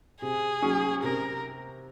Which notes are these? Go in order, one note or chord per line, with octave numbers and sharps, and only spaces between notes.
C3 G#4
F#3 C#4
C3 A#4